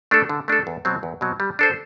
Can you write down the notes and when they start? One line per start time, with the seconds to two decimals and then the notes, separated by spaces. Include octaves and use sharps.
0.11 A3 D4 A4
0.29 D3
0.48 A3 D4 A4
0.67 E2
0.85 B2 F#3 C4
1.03 E2
1.21 B2 F#3 C4
1.40 G3
1.59 D4 A4 C5